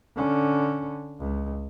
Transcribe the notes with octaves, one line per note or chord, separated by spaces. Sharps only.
D3 C#4
C#2